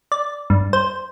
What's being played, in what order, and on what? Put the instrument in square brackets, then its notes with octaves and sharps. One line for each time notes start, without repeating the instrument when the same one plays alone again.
[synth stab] D5
G2
C5